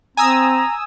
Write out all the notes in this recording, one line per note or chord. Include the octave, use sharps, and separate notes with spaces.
C4 G#5 A#5 D#6 E6